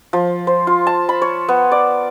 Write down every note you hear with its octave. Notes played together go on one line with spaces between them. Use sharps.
F3
C5
F4
A5
B5
C#5
B3
D5